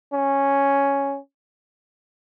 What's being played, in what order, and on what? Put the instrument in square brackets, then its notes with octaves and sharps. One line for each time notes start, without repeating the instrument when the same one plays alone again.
[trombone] C#4